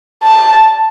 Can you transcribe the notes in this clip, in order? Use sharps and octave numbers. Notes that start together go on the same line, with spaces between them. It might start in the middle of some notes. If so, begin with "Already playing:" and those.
A5